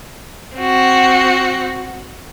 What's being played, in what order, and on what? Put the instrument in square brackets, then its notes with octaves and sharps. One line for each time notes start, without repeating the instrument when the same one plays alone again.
[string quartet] C4 F#4